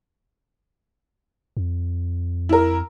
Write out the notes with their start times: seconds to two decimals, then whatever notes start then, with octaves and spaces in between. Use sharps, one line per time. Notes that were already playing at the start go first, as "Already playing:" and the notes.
1.57 F2
2.49 E4 A#4